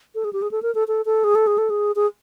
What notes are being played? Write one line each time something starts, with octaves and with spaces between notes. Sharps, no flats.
A4
G#4
G4
G#4
A4
A#4
A4
A4
A4
G#4
A4
G#4
A4
G#4
G#4